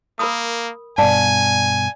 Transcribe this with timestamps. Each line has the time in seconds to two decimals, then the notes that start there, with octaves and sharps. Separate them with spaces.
0.19 A#3 A#4 B5 D#6
0.98 G2 B2 D5 F5 G#5 A5